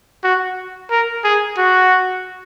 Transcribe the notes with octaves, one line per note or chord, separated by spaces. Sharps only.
F#4
A#4
G#4
F#4